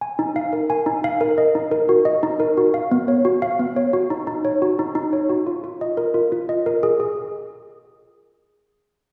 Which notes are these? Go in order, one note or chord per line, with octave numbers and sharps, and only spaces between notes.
G#5
D#4
F5
A#4
G#5
D#4
F5
A#4
D#5
D#4
A#4
F#4
D#5
D#4
A#4
F#4
F5
B3
C#5
F#4
F5
B3
C#5
F#4
D#4
D#4
C#5
F#4
D#4
D#4
C#5
F#4
F4
F4
D#5
A#4
F4
F4
D#5
A#4
G#4
G#4